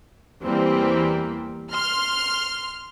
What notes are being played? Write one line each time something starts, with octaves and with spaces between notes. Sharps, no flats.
E2 E3 G3 A#3 C4
C6 F6